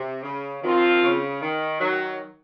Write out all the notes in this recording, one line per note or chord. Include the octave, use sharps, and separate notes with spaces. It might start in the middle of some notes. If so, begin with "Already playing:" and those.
Already playing: C3
C#3
D#3 F3 C4 F4
C#3
D#3
D#3 F#3